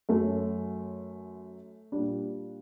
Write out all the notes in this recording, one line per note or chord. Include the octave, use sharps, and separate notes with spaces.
F#2 F#3 A3
A#2 G3 D4